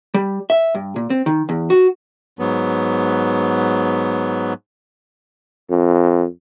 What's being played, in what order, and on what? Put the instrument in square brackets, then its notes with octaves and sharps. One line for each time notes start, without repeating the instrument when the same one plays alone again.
[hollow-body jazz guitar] G3
E5
G2
A#2
C4
D#3
E2
F#4
[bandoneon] G#2 F#3 B3
[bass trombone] F2